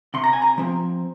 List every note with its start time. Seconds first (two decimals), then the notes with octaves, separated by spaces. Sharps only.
0.14 C3 C6
0.24 A#5
0.33 G#5
0.42 A#5
0.58 F3 C4